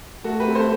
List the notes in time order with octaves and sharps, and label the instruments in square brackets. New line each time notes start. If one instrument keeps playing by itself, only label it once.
[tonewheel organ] A3 [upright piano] F#4 A4
[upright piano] G4 B4
[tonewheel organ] C4
[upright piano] A4 C5